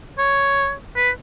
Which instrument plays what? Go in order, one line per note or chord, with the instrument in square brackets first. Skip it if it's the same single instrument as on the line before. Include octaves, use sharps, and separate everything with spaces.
[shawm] C#5
B4